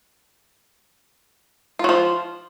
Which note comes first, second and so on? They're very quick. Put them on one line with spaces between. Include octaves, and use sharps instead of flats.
F4 F#3 F3